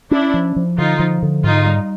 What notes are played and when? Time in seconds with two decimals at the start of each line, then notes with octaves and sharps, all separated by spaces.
0.11 C#4 D4 E4
0.34 F3
0.56 F3
0.78 D3 D#4 F4
0.99 F3
1.22 D3
1.44 G#2 D#4 F4
1.66 G3